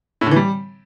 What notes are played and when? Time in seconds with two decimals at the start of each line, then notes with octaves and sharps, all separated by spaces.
0.21 A2
0.26 D3
0.31 E3
0.36 G3